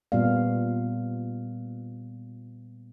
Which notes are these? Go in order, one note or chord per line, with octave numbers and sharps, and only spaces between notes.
A#2 G3 B3 C4 D5 F5